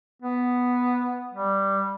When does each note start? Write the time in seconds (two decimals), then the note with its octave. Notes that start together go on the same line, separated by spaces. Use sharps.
0.22 B3
1.34 G3